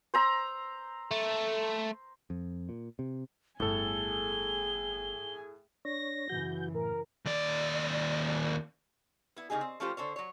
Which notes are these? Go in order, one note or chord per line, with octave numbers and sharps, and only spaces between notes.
C5 A#5 E6
A3
F2
A#2
C3
G1 A2 G#4 A4 G#5 G7
D4 C#5 A#6
F#2 C#3 E3 F#4 G6
A2 A#4
D#2 D5
B3 E4
C#3 A#3 D#4 G4 G#4
C4
F3 A3 C#4 F4 G4 C5
D3 A4 C5 C#5
F#3 C#5